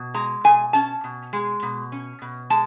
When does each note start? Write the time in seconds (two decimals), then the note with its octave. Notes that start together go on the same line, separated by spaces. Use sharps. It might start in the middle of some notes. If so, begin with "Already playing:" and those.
Already playing: B2
0.14 G#3 A#5
0.44 B2 G#5
0.73 C#4 A5
1.04 B2
1.33 G#3
1.63 B2
1.92 C#4
2.22 B2
2.50 G#3 A5